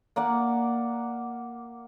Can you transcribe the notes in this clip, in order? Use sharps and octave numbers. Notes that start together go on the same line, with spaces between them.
A#3 D5 F#5